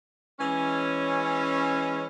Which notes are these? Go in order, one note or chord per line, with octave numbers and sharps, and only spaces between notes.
E3 G#3 C#4